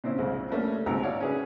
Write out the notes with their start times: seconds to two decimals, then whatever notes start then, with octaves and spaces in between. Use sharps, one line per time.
0.04 A#2 C4 C#4 E4
0.18 C2 F2 G#2 C#3
0.50 G3 A3 A#3 C#4
0.86 G#1 D#2 B3 C4 D#4 A#5
1.03 E4 F#4 C#5 D5 F5 F#5
1.20 C#4 G#4 B4